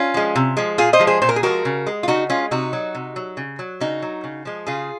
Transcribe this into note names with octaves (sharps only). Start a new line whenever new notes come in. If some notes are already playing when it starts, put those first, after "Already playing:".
Already playing: C#4 F4
F3 G#3
C3
F3 G#3
A#2 F4 G#4
C5 D#5
F3 G#3
G#4 C5
A#2 C5
A#4
G#4
F3 G#3 F#4 A#4
C#3
G#3
F4
C#3 D#4 F#4
G#3 C#4 F4
C3 D#4 F#4
F#3
C3
F#3
C#3
F#3
C#3 D#4 F#4
F#3
C#3
F3 G#3
C#3 F4 G#4